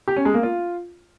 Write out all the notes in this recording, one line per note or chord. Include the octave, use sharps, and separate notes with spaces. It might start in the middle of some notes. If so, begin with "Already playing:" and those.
G4
C#4
G#3
A#3
F4